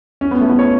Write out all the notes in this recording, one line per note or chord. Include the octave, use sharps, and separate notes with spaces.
C#4
B3
A3
B3
C#5